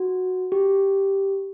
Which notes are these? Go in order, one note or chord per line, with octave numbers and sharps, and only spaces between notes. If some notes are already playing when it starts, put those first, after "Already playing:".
Already playing: F#4
G4